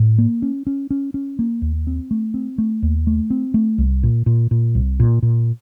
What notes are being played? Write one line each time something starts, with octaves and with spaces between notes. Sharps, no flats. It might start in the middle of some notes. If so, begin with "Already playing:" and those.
Already playing: A2
A#3
C#4
C#4
C#4
C#4
A#3
D#2
C4
A3
C4
A3
D#2
A3
C4
A3
C2
A#2
A#2
A#2
C2
A#2
A#2